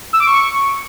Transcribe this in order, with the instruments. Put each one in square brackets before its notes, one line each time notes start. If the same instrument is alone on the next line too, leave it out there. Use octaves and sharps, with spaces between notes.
[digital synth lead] E6
D6
C#6